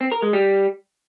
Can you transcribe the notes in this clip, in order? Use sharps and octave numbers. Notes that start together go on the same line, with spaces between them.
C4
A#4
G#3
G3